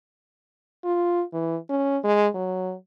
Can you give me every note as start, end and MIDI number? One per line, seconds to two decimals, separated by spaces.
0.84 1.22 65
1.33 1.56 52
1.69 1.98 61
2.04 2.27 56
2.35 2.74 54